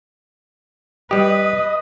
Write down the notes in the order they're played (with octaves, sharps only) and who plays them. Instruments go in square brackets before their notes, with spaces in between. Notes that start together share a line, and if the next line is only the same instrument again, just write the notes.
[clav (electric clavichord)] G3 G4 [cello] B4 [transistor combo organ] D#5